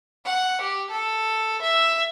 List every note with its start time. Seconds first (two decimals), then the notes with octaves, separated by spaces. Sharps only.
0.25 F#5
0.61 G4
0.91 A4
1.62 E5